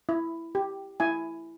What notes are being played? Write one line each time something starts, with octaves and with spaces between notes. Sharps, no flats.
E4
G4
E4 G#5